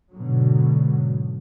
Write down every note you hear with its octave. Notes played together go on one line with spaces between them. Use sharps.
G#2 B2 D3 F#3